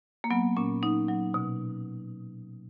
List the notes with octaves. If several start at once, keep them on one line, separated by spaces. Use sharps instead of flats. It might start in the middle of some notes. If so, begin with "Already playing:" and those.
A#3
F#3 B3
A#2 C#4
F#3 D#4
F#3
B2